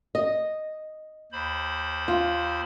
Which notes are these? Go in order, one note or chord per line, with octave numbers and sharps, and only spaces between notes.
D#5
D#2 C5 B5
F4